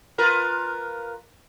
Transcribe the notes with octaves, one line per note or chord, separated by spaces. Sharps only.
F4 A#4 B4